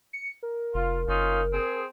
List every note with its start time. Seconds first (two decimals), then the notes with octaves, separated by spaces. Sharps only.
0.13 C#7
0.43 A#4
0.74 F1 F4
1.08 F#1 C#4 D#4 F4
1.53 C4 G#4